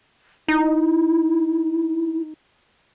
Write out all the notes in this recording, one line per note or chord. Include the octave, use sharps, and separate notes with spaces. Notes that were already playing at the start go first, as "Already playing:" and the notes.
D#4 E4